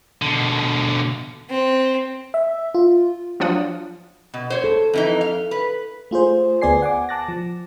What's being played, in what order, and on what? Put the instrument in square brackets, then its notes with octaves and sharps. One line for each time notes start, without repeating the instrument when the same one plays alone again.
[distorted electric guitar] B2 D3
[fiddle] C4
[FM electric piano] E5
F4
[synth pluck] F3 F#3 D4 F4 F#5 D#6
[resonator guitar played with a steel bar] B2
C5 C#5
[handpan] A4
[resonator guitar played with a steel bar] F2 E3 D#4
F5
B4
[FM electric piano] A3 F4 G#4 C5
D2 B3 G#4 D5 G#5 C7
F#5 G#5 D6
A5 D6 F#6 A6 A#6
F3